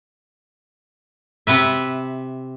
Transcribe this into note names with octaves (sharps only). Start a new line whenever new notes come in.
C3 B4 E5